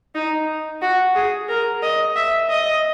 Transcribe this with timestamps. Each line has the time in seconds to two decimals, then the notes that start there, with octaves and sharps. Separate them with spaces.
0.15 D#4
0.82 F#4
1.15 G#4
1.49 A#4
1.83 D#5
2.16 E5
2.50 D#5